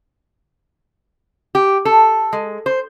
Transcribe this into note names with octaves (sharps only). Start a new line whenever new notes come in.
G4
A4
G#3
C5